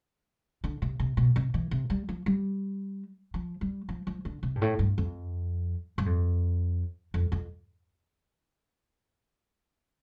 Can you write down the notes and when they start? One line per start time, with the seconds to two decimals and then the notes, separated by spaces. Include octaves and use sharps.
0.64 D3
0.82 C3
1.00 C3
1.17 B2
1.36 C3
1.54 E3
1.71 C3
1.90 G3
2.09 F3
2.26 G3
3.34 F3
3.61 G3
3.89 F3
4.07 F3
4.25 D3
4.43 C3
4.56 G2
4.62 A2
4.79 G2
4.98 F2
5.98 G2
6.06 F2
7.14 F2
7.32 F2